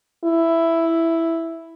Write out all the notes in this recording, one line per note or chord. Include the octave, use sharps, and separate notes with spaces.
E4